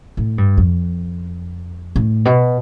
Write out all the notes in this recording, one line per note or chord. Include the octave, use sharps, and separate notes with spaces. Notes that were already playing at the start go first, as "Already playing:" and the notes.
A2
G2
F2
A2
B2